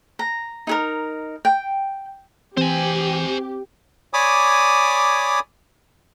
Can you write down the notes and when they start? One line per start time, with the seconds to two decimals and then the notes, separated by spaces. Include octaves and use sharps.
0.19 A#5
0.67 D#4 G#4 A#4
1.45 G5
2.57 E3 C4 G4 C5 G#5
4.14 C#5 D5 G#5 B5 D6 D#6